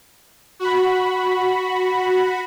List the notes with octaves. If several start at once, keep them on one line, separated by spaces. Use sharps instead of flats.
F#4 B5